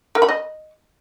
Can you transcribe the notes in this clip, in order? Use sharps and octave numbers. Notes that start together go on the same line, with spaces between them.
A#4
B5
D#5